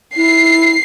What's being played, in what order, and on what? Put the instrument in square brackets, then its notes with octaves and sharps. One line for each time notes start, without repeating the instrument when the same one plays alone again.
[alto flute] E4 [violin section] C7